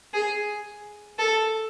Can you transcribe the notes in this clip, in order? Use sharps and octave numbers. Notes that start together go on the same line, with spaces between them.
G#4
A4